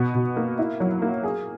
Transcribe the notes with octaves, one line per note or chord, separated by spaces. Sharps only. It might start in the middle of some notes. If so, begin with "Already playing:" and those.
Already playing: B2 B3
B2
A#3
E4
F#3
A#3
G#4